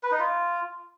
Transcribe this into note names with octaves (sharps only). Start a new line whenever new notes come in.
B4
D#4
F4